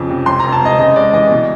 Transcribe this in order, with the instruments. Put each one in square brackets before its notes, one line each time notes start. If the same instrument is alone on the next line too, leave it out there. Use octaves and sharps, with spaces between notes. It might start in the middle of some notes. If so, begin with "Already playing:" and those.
Already playing: [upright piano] F2 C#3 F3
C3
F2 C6
F1 A#5
A5
C3 D#5
C#3 D#5
G#3 D5
E3 D#5
B2